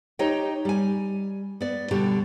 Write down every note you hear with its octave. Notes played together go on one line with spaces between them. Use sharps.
D#4 G4 C#5 D#5 G5
G3 G#5
B3 D5
B2 D3 G3 G4